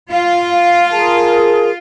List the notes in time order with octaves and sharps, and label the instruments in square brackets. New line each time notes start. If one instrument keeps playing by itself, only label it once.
[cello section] F4 [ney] F5
[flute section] G#4 A#4 [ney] A5